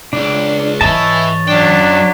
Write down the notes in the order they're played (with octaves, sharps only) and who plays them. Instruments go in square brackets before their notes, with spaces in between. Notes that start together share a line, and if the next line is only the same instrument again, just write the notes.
[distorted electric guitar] C#2 [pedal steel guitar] D4
[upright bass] G#2 E3 [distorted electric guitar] B4 E5 [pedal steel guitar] C#5 D#5 A5
[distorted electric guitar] F#2 G5 [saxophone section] F#3 D4